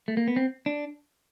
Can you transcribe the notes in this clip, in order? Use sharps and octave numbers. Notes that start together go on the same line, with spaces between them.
A3
A#3
B3
C4
D4